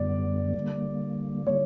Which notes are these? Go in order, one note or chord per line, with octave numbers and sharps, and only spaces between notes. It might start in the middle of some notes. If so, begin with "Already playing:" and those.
Already playing: F#2 D3 G3 B3 D5
D3 G3 A#3
D3 G3 A#3 C#5